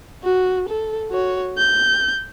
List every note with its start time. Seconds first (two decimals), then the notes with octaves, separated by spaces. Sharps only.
0.23 F#4
0.68 A4
1.11 F#4 C#5
1.58 G6